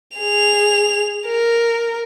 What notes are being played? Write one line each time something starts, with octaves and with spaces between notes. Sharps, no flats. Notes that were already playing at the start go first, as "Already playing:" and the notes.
G#4 F7
A#4